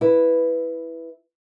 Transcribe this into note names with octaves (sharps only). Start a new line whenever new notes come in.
E4 B4